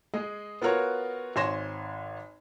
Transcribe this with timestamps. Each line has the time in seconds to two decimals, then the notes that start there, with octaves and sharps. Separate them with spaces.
0.14 G#3 G#4 D#5
0.62 B3 F4 F#4 A#4 C#5
1.36 G#1 C#5 G#5 C6 A#6 E7